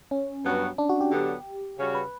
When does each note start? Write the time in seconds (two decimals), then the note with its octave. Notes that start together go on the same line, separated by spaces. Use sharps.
0.11 C#4
0.44 G2 F#3 B3 F#4
0.78 D4
0.89 F#4
1.01 G4
1.11 D3 F#3 B3 D4
1.79 C#3 G3 C#4 F#4
1.95 B4